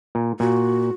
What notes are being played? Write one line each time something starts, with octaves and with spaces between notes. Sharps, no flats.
A#2
A#2 F#4